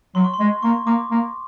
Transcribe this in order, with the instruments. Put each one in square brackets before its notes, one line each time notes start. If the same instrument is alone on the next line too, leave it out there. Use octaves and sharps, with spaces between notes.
[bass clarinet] F#3 [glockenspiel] C6
[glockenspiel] C#6
C6
[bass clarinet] G#3
[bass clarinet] A#3 [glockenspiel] C#6
[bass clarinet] A#3 [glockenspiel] D6
[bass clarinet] A#3